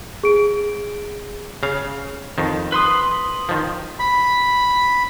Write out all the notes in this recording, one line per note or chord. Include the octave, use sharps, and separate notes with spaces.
G#4 D7
C#3 F5
F2 D#3
B4 C6 D#6
D#3 F3
B5